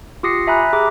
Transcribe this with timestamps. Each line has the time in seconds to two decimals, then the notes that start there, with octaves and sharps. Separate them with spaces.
0.23 F4 G4 D#6 A#6 C7 C#7
0.47 E5 G#5 A#5 B5 F#6
0.73 G4 G#4 E5 A#5 D6